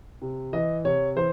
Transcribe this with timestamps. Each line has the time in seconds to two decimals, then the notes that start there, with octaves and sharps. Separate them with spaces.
0.22 C3
0.53 E3 D#5
0.85 C3 C#5
1.16 E3 C5